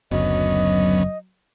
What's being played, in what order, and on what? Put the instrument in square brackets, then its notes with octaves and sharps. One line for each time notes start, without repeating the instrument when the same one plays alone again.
[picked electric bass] F#1 [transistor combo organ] D2 B3 C#4 [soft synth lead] F#3 [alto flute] D#5